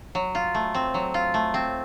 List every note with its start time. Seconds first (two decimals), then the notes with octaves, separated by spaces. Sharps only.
0.15 F#3
0.35 F4
0.54 A3
0.75 C4
0.94 F#3
1.14 F4
1.34 A3
1.54 C4